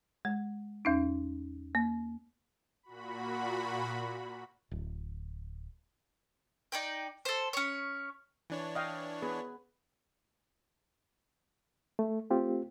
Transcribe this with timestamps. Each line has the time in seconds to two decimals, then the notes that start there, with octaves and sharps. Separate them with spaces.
0.25 G#3
0.85 E2 C#4 D#4
1.75 A#3
2.83 A#2 F#4 B5
4.71 D1
6.72 D#4 D5 G5
7.25 A4 C5
7.53 C#4 C#5
8.50 E3 D4 C#5
8.75 D#5 F5 G5
9.22 B3 G#4 B4
11.99 A3
12.30 A3 C4 F4 G4